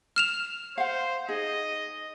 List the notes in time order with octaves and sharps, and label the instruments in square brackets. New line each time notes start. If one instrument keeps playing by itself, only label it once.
[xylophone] F6 E7 F7
[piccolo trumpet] C5 [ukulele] F5 F#5
[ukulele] D#4 G#4 [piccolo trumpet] D#5